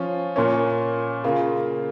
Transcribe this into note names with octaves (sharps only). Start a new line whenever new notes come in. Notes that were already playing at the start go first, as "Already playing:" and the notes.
Already playing: F3 C#4 F4
A#2 A#3 C#4
C#3 A#3 F4